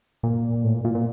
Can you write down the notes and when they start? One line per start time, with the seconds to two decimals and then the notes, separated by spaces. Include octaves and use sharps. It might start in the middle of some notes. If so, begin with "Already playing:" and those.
0.23 A#2
0.64 A2
0.74 A#2
0.85 A#2
0.95 A#2